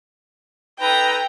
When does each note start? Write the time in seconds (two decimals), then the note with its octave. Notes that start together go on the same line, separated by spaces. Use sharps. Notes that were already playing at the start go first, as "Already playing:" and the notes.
0.80 D#4 A4 B4 G5 A#5